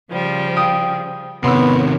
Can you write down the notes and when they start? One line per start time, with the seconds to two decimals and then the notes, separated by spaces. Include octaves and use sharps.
0.10 C#3 F3 G3
0.56 F5 G5 D#6
1.44 C3 D#3 B3 C#5 C6 E6